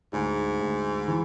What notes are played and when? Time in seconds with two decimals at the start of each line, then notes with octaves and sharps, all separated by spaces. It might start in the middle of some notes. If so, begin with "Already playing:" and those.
0.13 D2 G#2
0.61 D2
1.08 E3